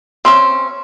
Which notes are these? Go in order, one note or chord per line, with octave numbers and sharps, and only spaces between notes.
C4 C#4 E5